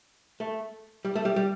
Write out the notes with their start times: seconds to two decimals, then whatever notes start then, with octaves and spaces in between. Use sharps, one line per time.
0.40 A3
1.05 G3
1.16 A3
1.25 G3
1.36 G3